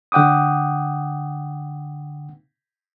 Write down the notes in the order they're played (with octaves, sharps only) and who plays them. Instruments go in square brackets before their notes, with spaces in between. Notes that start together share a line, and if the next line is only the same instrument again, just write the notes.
[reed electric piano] D3 F#5 G5 D6 D#6